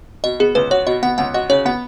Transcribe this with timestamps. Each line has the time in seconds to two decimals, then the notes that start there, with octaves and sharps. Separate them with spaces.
0.24 B2 D#5
0.40 B3 G#4
0.55 C#2 B4
0.71 F#4 C#5
0.87 B2 D#5
1.03 B3 F#5
1.18 C#2 F#5
1.34 F#4 D#5
1.49 C#3 C#5
1.65 B3 F#5